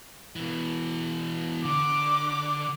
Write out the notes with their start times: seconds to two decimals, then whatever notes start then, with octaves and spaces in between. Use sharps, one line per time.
0.36 B2 E3
1.65 D3 D6